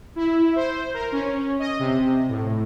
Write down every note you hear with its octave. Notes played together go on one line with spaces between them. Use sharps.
E4
C5
A#4
C#4
D#5
C3
A2